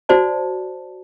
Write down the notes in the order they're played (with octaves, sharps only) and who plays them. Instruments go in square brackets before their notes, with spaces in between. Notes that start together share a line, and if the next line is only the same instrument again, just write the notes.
[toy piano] F#4 C5 D5 A5